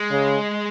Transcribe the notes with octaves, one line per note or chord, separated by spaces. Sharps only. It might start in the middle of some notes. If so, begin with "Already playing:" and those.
Already playing: G#3
C#3